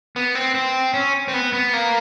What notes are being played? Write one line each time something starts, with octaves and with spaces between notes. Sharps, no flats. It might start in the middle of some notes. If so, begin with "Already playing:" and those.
B3
C4
C4
C#4
C4
B3
B3
A#3